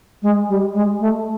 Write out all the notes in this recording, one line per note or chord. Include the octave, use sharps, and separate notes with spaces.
G#3
G3
G#3
A3